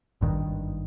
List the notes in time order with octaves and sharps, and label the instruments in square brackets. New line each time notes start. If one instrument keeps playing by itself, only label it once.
[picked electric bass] G#1 G2 D#3